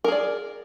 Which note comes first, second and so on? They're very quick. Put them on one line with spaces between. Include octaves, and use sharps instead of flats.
A#4 G#4 D5